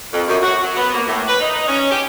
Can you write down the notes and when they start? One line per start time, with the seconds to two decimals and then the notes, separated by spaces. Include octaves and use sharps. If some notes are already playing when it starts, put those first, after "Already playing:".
0.13 F2
0.28 F#2
0.43 F#4
0.63 F#3
0.77 B3
0.94 A#3
1.07 A2
1.28 B4
1.41 D#4
1.68 C#4
1.91 G4